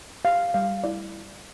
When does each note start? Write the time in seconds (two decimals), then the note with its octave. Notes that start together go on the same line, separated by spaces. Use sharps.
0.25 G4 F5
0.54 G3 F5
0.84 E4 D5